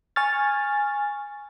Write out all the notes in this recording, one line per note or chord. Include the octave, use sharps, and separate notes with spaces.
G#5 C#6 F6 A6